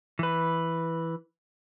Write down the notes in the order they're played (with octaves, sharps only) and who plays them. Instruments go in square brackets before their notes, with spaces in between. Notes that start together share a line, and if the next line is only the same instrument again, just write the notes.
[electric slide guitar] E3 B4